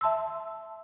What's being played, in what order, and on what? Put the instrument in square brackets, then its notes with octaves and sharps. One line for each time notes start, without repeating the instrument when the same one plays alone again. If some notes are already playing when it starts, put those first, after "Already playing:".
[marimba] E5 A5 C6 E6